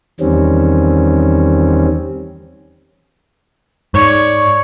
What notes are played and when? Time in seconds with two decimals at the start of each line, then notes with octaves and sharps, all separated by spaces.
0.20 E2 D#3 G3 C4 C#4
3.94 G#2 C#5 D5 C#6